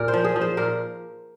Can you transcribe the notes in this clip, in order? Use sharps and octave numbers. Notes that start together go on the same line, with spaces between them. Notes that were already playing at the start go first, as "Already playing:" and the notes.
Already playing: A#2 A#4
C5
F3
G#4
F3
C5
A#2 A#4